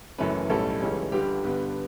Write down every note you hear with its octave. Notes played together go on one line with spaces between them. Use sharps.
F#1 F#2 E3 A3 C#4 B4
B1 A2 G3 C#4 A4
C#2 C#3 E3 G3 C#4
G1 G2 D3 G3 G4
G2 D3 G3 B3